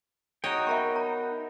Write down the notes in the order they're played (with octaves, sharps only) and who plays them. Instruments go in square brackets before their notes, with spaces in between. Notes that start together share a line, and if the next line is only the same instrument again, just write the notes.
[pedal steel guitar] D#4 F#4 G5 [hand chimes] G#4 A#5 [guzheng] C#5 D#5
[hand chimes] B3 A#4 B5 [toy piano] E5 A#5 C#6
[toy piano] A#5